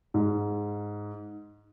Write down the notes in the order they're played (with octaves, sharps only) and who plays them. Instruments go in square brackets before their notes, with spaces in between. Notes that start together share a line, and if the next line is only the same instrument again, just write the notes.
[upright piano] G#2